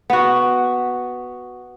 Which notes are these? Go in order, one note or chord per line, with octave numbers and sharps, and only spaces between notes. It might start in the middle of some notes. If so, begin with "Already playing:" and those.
B3 F#4